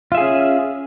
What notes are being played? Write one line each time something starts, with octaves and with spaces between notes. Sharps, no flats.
C#4 F4 G#4 E5